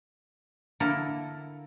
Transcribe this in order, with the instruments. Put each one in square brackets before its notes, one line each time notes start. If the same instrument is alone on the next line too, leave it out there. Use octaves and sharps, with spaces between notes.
[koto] D3 A#3 E4 A4 A#4